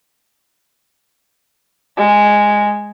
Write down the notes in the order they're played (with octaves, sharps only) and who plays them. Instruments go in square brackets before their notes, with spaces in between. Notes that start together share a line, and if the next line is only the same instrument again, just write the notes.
[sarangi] G#3